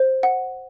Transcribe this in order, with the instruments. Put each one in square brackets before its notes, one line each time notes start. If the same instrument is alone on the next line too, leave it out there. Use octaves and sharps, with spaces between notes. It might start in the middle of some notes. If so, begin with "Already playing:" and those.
Already playing: [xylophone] C5
F#5